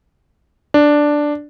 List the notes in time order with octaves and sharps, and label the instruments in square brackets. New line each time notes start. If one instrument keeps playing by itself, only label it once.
[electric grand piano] D4